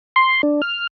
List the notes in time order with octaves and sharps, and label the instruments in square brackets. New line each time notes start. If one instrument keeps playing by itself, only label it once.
[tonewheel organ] C6
D4
F6